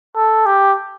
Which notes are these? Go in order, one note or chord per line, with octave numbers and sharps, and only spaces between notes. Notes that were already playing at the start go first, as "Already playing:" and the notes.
A4
G4